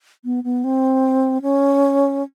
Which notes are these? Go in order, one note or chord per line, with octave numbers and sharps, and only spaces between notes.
B3
B3
C4
C#4